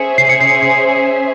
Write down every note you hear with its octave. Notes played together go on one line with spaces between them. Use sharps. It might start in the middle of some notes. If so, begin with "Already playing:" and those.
Already playing: C#4 G#4 C5 E5 G#5 C#7
C7
C#7
C7
C7